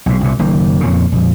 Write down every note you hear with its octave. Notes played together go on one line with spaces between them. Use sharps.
B1 G#2
C2 A#2
F#1 D#3 A#3
F2 A#2 C#3
A#1 F2